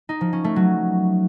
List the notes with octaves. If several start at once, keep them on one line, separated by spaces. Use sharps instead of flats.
D#4
F3
C#4
A3
F#3